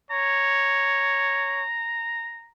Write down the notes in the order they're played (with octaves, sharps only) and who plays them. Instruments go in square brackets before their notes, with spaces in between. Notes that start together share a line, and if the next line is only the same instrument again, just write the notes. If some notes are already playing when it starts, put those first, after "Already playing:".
[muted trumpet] C#5 [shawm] A#5